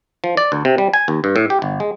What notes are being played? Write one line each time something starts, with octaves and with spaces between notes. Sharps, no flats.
F3
D5
D2
C3
G3
G#5
D#2
G2
A2
G4
G1
G#3